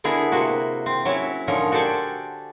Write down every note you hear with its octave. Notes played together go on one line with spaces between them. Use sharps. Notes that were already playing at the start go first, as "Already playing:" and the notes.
D3 B3 E4 G#4 A#4
C3 A#3 F#4 B4
C4
F#3 C#4 E4 E5
A#2 D3 F3 C#4 D#4 A#4
F#4 G4 A4 C5 D5 G#5